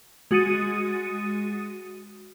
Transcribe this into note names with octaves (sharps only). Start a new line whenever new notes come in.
G#3 F#4 D#6 A6 C#7 D#7